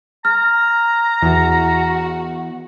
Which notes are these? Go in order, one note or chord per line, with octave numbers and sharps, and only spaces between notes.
A#5 F6
E2 F#4